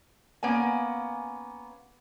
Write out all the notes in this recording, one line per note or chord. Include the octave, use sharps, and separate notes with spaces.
A#3 B3 C#4 G#5